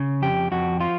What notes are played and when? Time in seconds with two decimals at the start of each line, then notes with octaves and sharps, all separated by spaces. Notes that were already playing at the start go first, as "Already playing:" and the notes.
Already playing: C#3
0.22 F2 G4
0.52 F2 F#4
0.80 F3 F4